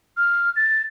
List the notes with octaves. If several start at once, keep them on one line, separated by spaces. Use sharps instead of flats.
F6
A6